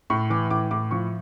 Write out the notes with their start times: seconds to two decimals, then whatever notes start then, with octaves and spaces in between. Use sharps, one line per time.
0.10 A2 C#6
0.30 E3 D6
0.51 A2 D6
0.71 A2 D6
0.91 F3 C#6